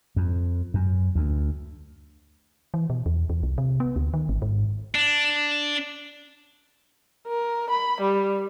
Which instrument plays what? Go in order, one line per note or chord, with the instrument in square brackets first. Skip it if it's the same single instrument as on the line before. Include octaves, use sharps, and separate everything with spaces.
[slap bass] F2
F#2
D2
[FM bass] E3
B2
E2
E2
C2
C3
B3
D2
D#3
G#1
G#2
[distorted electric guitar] D4
[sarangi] A#4
B5
G3